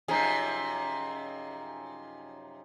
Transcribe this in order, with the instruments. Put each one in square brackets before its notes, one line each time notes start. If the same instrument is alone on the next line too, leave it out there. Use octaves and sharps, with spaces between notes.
[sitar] F#2 C3 F3 [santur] D#4 G#4